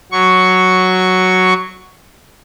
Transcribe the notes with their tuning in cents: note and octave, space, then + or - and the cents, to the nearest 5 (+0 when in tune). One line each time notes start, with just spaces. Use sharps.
F#3 +0 C#6 +5